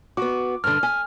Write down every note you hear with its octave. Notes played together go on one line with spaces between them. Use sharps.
B3 F#4 D6
G2 D3 F6
G#5